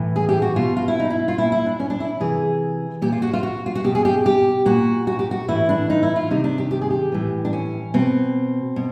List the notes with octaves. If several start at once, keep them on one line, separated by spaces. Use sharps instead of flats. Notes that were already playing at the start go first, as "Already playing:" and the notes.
Already playing: A2 E3
G#4
G4
F#4
B2 F4
F4
E4
D#4
E4
F4
A#2 E4
E4
D4
C#4
D4
E4
C3 E3 G#4
A#2 G4
F4
F#4
F4
F#4
F4
F#4
B2 G4
G#4
G4
G4
A#2 F#4
F#4
G4
F#4
A2 E3 E4
D4
D#4
E4
F4
C3 D#3 D#4
D4
G4
G4
G#4
G4
A2 E3
D4
C#4
B2 C4
B2